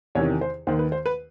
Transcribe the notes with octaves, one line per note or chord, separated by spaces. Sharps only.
E2 C3 D#3 C#5
C5
D#2 D#3 C5
B4
C5
B4